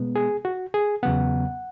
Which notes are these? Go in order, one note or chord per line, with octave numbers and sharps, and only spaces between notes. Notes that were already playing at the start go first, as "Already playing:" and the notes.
Already playing: B2 G#3 B3
G#4
F#4
G#4
E2 C#3 F#3 B3 F#5